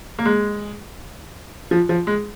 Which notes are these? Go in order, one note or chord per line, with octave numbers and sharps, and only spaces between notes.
A#3
G#3
F3
F3
G#3